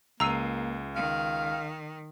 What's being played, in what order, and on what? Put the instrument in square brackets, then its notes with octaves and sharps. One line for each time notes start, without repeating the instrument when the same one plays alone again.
[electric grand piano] C#2 C7 D#7 [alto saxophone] A#3 [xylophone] A#5 E6
[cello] D#3 [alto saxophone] F5